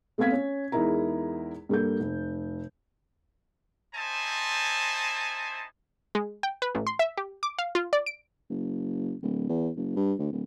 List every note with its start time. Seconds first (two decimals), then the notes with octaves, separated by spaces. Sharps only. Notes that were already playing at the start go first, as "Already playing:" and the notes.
0.18 A3 B3 C4 F5 G#6 B6
0.32 C#4
0.72 E2 G#3 D#4 E4 A#4 A#5
1.69 G2 A#3 A4 G6
2.00 F1
3.95 C4 D#4 E4 C5 G#5 A5
6.15 G#3
6.43 G5
6.62 B4
6.75 A1
6.87 C6
6.99 E5
7.17 G4
7.43 D6
7.58 F5
7.75 F4
7.93 D5
8.06 D7
8.50 F#1
9.22 D1
9.49 E2
9.76 F#1
9.96 G2
10.19 D2
10.32 D1